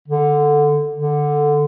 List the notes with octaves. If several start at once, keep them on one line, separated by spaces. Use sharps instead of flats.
D3
D3